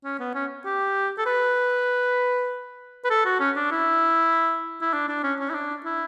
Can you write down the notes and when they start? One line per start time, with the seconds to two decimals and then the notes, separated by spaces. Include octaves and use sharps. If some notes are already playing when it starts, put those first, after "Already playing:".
0.04 C#4
0.19 B3
0.35 C#4
0.65 G4
1.18 A4
1.26 B4
3.05 B4
3.10 A4
3.25 F#4
3.40 C#4
3.56 D4
3.71 E4
4.82 E4
4.93 D4
5.08 D4
5.23 C#4
5.40 C#4
5.50 E4
5.55 D4
5.85 E4